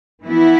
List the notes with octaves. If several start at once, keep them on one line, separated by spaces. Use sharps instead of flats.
E3 B3 E4